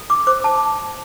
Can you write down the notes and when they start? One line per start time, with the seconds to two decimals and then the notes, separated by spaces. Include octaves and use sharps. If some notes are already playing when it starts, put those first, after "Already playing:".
Already playing: A4
0.10 D6
0.27 C5 D6
0.44 A5